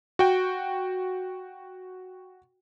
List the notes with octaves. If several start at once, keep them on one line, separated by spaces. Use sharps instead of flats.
F#4 G5